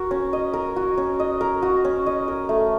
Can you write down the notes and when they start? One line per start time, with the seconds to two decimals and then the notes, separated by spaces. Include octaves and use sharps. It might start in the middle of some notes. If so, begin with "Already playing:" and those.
Already playing: F#4 A#4
0.11 C#4
0.33 D#5
0.54 A#4
0.76 F#4
0.98 C#4
1.20 D#5
1.41 A#4
1.63 F#4
1.85 C#4
2.06 D#5
2.28 A#4
2.49 A3